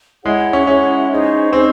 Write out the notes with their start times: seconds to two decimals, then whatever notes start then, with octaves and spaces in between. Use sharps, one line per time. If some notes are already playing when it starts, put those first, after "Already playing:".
0.25 G#3 E4 G#4 C#5 F#5
0.53 C#4
0.67 C#4 E4 G#4 C#5 F#5
1.11 D#4 G#4 C5 D#5
1.53 C4 D#4 G#4 C5 D#5